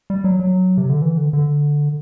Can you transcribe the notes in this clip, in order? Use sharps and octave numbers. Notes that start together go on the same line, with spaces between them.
G3
F#3
F#3
C3
D3
E3
D3
D3